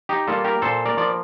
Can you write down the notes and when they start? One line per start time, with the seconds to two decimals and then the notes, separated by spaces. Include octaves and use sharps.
0.09 D#4 G4
0.27 G3 A#3 F4 A4
0.44 G4 A#4
0.62 A#2 A4 C5
0.86 A#4 D5
0.97 F3 A#3 D5